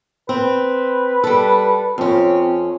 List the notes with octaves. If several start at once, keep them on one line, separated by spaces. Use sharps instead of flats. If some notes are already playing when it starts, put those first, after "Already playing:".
C4 B4
G3 A4
F2 C4 C#4